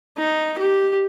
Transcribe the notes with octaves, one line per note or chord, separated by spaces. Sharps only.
D#4
G4